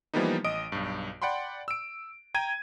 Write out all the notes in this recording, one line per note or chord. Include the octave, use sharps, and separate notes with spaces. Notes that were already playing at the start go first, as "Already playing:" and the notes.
E3 F3 G3 A#3 B3 D#4
A1 D#5 D#6 D7
B1 G2
D5 F#5 G5 B5 C6
E6 D7
G5 A#5 G#6 D#7